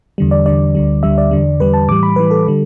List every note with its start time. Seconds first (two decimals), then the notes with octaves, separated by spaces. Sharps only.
0.18 E2 D3 G3
0.31 D5
0.46 E2 D3 G3 D5
0.75 D2 D3 G3
1.03 D2 D3 G3 E5
1.18 D5
1.31 E2 D3 G3
1.60 E2 D3 G3 B4
1.74 A5
1.89 A2 E3 G3 D6
2.03 B5
2.16 A2 E3 G3 B4
2.31 A4
2.47 D3 G3